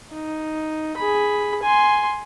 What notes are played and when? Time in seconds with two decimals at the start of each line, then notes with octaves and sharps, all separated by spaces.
0.13 D#4
0.97 G#4 B5
1.63 G#5 C6